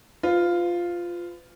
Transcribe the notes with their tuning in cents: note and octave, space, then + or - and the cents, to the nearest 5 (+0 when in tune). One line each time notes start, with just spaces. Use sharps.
F4 +0 B4 +40